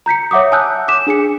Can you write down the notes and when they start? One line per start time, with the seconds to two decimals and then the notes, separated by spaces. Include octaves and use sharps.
0.06 A#5 G6 B6 C#7
0.31 C#5 E5 F#5 D6 D#6
0.52 G#5 A5 D#6 E6 F#6 G6
0.88 D6 B6 E7
1.07 D4 G#4 G#5 C#7